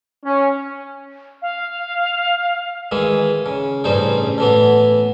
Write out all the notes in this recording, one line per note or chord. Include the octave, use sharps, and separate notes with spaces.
C#4
F5
D#3 E3 G#3
C#3
A1 G2 C#3 D#4 C5
A2 E3 B3